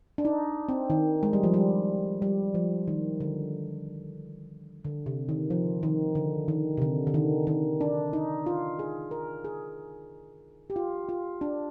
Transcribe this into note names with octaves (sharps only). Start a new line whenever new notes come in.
D4
D#4
C4
D#3
G#3
G3
F3
G3
G3
F3
D#3
D3
D3
C3
D#3
F3
D#3
D3
D#3
C3
D3
D3
D#3
D#3
D4
D#4
F4
G#4
A#4
G#4
G4
F4
F4
D4